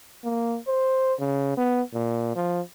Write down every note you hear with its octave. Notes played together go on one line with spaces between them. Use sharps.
A#3
C5
C#3
B3
A#2
F3